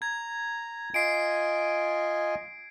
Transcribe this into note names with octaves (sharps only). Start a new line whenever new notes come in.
A#5 G#6
F4 D#5 G#5 C7 D7